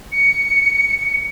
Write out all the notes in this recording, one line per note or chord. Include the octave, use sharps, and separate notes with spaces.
C#7